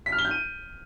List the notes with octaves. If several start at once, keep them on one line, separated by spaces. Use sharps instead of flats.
B6
F6
G7
G6
D#7